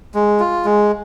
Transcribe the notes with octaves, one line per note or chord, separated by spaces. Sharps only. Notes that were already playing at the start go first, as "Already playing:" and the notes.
G#3
F4
G#3